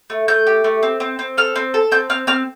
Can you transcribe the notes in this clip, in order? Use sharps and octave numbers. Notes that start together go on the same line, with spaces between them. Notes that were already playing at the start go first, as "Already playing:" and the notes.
A3
A3 G6
G4
A3
C4
C4
C4
A4 F6
C4
A4
C4 G6
C4 F6
C4 F6